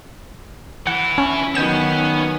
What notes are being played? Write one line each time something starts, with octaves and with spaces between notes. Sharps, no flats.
E3 E4 F#5
C#4
D#3 F#3 B3 C#4 G6 E7